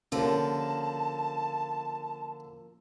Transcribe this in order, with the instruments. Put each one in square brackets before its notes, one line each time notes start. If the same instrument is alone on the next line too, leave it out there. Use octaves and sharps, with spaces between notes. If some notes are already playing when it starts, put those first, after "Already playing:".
[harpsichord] D3 [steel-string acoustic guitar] F3 A#3 [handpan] C#4 G4 [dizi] A5